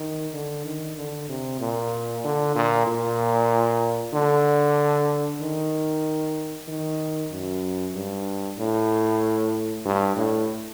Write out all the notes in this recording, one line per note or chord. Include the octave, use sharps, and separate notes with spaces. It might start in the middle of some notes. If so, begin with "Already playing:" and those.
Already playing: D#3
D3
D#3
D3
C3
A#2
D3
A#2
A#2
D3
D#3
D#3
F#2
G2
A2
G2
A2